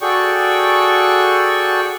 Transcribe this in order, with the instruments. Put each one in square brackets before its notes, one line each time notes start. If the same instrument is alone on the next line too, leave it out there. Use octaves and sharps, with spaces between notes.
[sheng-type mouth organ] F#4 G#4 A4 D5 G5 C#6